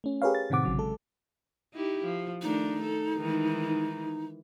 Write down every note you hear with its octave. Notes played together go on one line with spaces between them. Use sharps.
A3 C#4
G4 G#4 A#4 B4 C#5 F5
A6
A2 C3 D#3 C4 F#5 D6
A1 C#3 F#3 D6
G#3 A4
D#4 E4 G4
F3
D#3 A3 D4 D#4
A4
D#3 E3 G#3